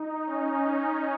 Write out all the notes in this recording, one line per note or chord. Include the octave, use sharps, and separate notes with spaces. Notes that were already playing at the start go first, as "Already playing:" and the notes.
Already playing: D#4
C#4